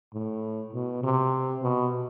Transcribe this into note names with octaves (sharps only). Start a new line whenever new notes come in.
A2
B2
C3
B2